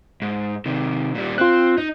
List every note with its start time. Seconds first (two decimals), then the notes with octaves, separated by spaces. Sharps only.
0.22 G#2
0.66 C3 D#3
1.15 A#2 G3
1.38 C4 F4 F#6
1.77 D#4